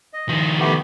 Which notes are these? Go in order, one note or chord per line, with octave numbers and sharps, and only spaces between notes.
D#5
D#3 F3
A3 B3 G4